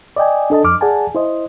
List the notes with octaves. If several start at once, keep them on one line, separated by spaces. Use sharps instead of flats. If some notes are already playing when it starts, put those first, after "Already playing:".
D5 D#5 G5 G#5
D4 A4 D#5 A5
F2 D6 F6
G#4 D5 F#5 G#5 A5
E4 C5 D#5